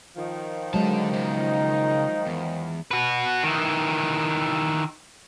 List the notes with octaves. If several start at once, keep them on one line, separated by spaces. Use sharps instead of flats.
D#3 F3
D3 F#3 G#3 A5
C#3 D#4 C5
E2
F#4 B4
D#3 E3